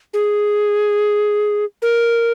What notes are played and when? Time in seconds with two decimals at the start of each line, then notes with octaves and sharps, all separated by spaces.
0.14 G#4
1.82 A#4